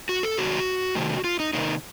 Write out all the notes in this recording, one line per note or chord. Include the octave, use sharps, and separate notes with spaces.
F#4
A4
C3 D#3 F#3 A#3 F#4
C3 D#3 A3
F4
D#4
C3 D#3 A#3 D#4